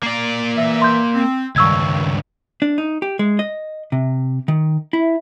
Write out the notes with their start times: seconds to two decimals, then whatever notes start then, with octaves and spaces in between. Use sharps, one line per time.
0.03 A#3 D5 C7
0.56 E3 A#4 E5
0.82 C6 G6
1.14 C4
1.56 C#2 G2 D#3 C#6 E6 G#6
2.62 D4
2.78 D#4
3.02 G4
3.19 G#3
3.39 D#5
3.92 C3
4.48 D#3
4.93 E4